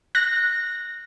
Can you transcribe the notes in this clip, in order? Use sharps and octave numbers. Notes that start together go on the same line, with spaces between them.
F#6 A#6